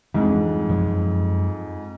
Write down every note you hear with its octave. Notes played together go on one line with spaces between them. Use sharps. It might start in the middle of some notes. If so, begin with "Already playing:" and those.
F2 G#2 E3 G3 D4
F#2 F3 G#3